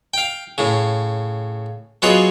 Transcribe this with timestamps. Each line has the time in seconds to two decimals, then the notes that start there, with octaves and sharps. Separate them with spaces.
0.14 F5 G5
0.58 A2 C#3
2.02 F#3 B3 F4 G#4 C#5 D#5